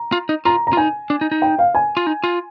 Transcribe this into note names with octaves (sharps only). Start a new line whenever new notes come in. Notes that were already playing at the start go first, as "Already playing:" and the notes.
Already playing: A#5
F4
D#4
F4 A#5
A#5
F4
D#4 G#5
D4
D#4
D#4
G5
F5
G#5
F4
D#4
F4